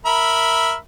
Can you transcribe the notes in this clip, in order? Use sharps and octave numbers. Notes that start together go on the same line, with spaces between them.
A#4 E5 B5